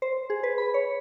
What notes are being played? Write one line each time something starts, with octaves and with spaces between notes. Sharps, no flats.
C5
G#4
B4
B5
C#5